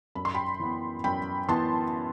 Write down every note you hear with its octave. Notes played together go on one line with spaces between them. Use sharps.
F#2 B5
C6
G5 B5
E3 B3
F#2 G5 B5
E3 B3 A5 C6